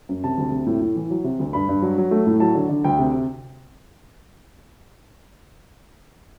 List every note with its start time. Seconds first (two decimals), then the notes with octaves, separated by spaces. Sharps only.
0.09 F#2
0.24 C3 A5
0.38 D2
0.52 C3
0.66 A2
0.81 A2
0.96 E3
1.10 F#3
1.24 C3
1.39 D2
1.53 G2 B5
1.69 G2
1.82 F#3
1.98 F#3
2.11 A3
2.27 A2
2.40 F#3 A5
2.55 D3
2.69 D3
2.84 D2 G5
2.99 C3